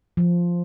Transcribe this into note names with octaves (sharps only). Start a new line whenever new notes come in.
F3